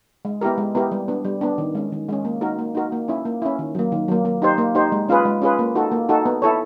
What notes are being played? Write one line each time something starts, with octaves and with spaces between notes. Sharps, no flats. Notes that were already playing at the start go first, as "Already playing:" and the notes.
G#3
B3 E4 G4 A#4
G#3
B3 E4 G4 A#4
G3
B3 D4
G3
B3 D4
D#3
G#3 C#4
D#3
G#3 C#4
A#3
D#4 F#4 A#4
A#3
D#4 F#4 A#4
A#3
C#4 E4
A#3
C#4 E4
D#3
F#3 A#3
D#3
F#3 A#3
A#3
D#4 G4 C5
A#3
D#4 G4 C5
G#3
C#4 F4 G#4 B4
G#3
C#4 F4 G#4 B4
A#3
D#4 F#4 A4
A#3
D#4 F#4 A4
B3
E4 A4 C#5